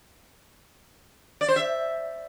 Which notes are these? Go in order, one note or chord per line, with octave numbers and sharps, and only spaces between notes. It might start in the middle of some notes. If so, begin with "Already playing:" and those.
D5
C5
E5